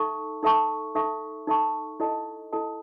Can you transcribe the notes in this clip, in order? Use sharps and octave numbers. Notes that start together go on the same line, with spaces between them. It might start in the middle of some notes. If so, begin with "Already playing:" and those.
Already playing: D#4 A4 E5 A5 C#6
D#4 A4 E5 A5 C#6
D#4 A4 E5 A5 C#6
D#4 A4 E5 A5 C#6
E4 A4 D#5 A5
E4 A4 D#5 A5